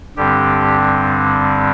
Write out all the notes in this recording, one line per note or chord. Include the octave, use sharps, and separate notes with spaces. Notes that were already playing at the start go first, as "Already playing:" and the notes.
G2 D3 G3 C4 G4